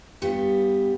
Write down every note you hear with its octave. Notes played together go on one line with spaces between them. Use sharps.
G2 G3 B3